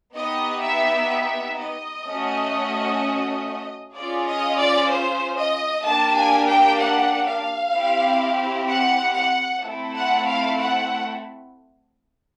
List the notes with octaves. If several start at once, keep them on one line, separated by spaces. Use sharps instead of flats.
B3 D#4 G4 D#5
E5
E5
D#5
A3 C#4 F#4
C#4 F4 G#4 D5
D#5
D5
C5
D#5
A#3 D4 G4 A5
G#5
G5
F#5
F5
C4 E4 G4
F#5
F#5
A3 C4 E4 A4
F#5
F5
F#5